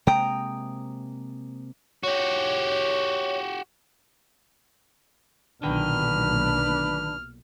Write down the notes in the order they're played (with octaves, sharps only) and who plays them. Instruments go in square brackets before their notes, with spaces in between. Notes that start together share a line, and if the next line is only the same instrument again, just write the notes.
[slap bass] C3 G#3 A#3 [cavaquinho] G5 A#5 D#6
[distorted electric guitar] F#4 G4 [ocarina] C#5
[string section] B1 A#2 [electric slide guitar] D3 D#3 G5 [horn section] D4 B4 [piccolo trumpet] F6